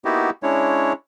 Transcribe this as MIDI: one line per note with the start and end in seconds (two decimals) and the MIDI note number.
0.05 0.30 58
0.05 0.30 59
0.05 0.30 63
0.05 0.30 64
0.05 0.30 66
0.05 0.30 67
0.43 0.93 56
0.43 0.93 61
0.43 0.93 62
0.43 0.93 64
0.43 0.93 73